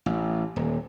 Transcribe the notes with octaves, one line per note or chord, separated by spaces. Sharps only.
A1
D#1